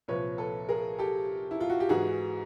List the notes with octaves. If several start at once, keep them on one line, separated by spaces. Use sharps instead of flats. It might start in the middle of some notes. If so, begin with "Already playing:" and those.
C2 A#2 F3 B4 C#5
A4 B4
G#4 A#4
G4 A4
E4
F4
F#4
G4
G#2 E3 F#4 G#4